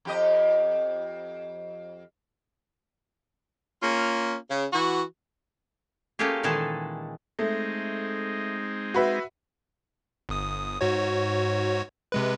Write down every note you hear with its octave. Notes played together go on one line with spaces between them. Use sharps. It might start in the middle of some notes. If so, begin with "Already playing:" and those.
F2 G4 D#5
A#3 C#4 F4
C#3
E3 F#4
A3 A#3 C#4 F4 G4 G#4
A#2 D#3 E3 G#3 G#4 A4
G#3 A3 C4 D#4
F#4 B4 E5
G1 D#6
G#2 F#4 C#5
C3 G#3 B4